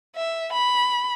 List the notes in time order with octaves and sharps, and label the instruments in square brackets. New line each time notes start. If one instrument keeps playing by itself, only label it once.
[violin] E5
B5